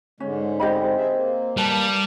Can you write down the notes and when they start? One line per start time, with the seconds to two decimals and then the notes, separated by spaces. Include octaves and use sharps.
0.20 G#2 D3 G#3 C#4
0.60 C4 G4 D#5 B5
0.96 G#4 E5
1.12 A#3
1.57 G3 B4 A5